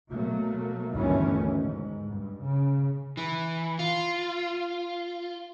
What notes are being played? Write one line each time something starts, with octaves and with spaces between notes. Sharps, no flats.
B2 F#3 A3 A#3
G1 D2 D#3 E3 A3 C#4
G#2
G2
C#3
E3
F4